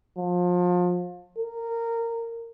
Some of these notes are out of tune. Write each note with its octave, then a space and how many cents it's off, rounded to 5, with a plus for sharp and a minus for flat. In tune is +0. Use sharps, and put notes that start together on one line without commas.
F3 +30
A#4 -15